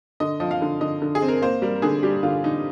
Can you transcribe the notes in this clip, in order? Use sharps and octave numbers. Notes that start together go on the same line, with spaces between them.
D3 D#5
F3 D#5
F5
D3
D3 D#5
D3
G#4
C4
A#4
A#3 C5
G3 A#4
A#4
D3 G#4
G3 G4
D3 F4
D3 D#4